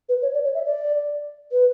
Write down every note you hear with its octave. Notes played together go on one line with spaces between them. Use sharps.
B4
C#5
D5
C#5
E5
D5
B4